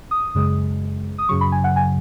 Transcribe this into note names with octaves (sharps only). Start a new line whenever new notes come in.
D#6
F#2 C#3 G#3
D#6
F#2 C#3 F#3 C#6
B5
G#5
F#5
G#5